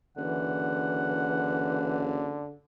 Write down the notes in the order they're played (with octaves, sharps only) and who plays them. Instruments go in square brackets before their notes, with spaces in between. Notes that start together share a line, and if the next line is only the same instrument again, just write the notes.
[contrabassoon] F#1 [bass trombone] D3 [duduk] E3 [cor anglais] F#5